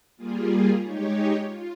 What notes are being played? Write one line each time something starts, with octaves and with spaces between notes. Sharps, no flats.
G3 A#3 F4 G#4
G#3 D#4 G4 C#5
F4